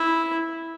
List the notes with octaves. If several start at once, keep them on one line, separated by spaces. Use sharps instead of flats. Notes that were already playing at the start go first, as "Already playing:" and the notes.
Already playing: E4